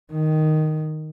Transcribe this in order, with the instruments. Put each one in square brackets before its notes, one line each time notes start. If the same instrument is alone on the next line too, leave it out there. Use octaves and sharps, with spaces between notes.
[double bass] D#3